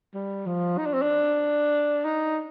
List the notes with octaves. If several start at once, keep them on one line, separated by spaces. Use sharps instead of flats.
G3
F3
D#4
D4
C4
D4
D#4